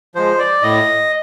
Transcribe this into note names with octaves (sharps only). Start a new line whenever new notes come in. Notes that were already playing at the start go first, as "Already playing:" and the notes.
F3 G#3 C5
D5
A2 D#5